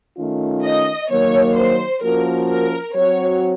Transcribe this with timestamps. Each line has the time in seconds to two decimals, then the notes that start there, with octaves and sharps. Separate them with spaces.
0.18 D#3 A3 C#4 F4
0.64 D#5
1.10 D#3 F#3 A#3 C#5
1.56 C5
2.02 F3 A#3 C#4 F#4 A#4
2.49 A#4
2.95 F#3 C4 F#4 C#5